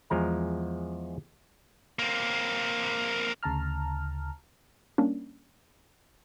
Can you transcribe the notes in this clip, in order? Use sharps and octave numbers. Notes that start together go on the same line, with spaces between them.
E2 F3 G#3 A#5
A#3 C4
D2 C#3 A5 A#5 F6
G3 A#3 C#4 D4